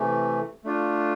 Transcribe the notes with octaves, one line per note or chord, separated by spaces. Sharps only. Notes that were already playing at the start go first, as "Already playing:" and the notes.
Already playing: C3 E3 A3
A3 D4 F4